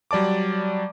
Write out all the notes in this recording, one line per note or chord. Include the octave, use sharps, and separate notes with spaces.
F#3 G3 D5 A5 D6